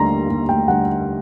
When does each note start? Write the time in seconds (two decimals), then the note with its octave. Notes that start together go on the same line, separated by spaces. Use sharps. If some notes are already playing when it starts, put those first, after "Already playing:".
Already playing: D#2 D3 G3 A#5 C6
0.29 D#2
0.49 G5
0.68 D3 G3 F#5